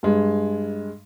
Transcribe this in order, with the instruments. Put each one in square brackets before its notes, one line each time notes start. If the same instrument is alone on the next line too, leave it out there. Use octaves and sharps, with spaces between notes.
[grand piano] G2 G#3